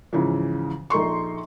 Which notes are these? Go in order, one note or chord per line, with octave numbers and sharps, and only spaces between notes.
G#2 C#3 E3 F3
A#1 D#4 A4 C6 C#6